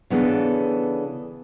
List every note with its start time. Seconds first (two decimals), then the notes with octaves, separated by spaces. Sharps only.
0.10 C#3 E3 B3 D4 G#4 A4